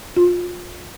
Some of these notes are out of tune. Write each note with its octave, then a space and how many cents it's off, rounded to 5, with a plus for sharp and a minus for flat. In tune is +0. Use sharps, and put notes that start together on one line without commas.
F4 +25